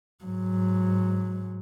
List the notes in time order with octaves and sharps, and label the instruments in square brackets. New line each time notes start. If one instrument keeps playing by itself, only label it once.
[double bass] G#2 F#3